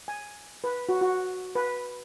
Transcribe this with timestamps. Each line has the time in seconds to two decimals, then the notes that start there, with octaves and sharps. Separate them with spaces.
0.08 G#5
0.64 B4
0.89 F#4
1.01 F#4
1.55 B4